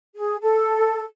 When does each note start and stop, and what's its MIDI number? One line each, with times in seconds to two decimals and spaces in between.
0.16 0.36 68
0.41 1.02 69